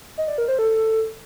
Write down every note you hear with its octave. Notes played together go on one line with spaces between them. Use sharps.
D#5
D5
A#4
C5
A4